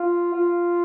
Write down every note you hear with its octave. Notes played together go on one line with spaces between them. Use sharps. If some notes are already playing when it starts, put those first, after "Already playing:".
Already playing: F4
F4